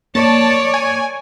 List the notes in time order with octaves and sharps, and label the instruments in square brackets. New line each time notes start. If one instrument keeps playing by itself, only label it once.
[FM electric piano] A#3 [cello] C#5 D5 [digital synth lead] A5
[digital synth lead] G#5